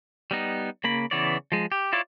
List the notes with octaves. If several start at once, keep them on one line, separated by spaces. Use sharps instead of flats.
G3 B3 D#4
C#3 A#3 B5
C#3 E3 B3 C#5 D5
F3 G#3
G4
E4 F4 C#5 D5